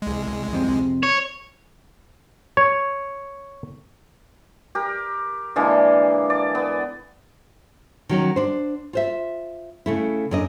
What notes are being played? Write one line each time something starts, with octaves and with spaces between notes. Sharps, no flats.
C2 G#3
F2 C3
C#5
C#5
G4 A#4
D3 E3 G#3 A#3
D5
B3
D#3 F#3 C#4
D4 C5
F4 C5 E5
C#3 A3 E4
F#2 D4 D#5